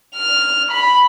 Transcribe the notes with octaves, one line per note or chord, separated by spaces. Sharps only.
F6
B5